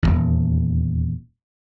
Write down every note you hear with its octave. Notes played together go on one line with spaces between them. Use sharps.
D#1 G#1 E2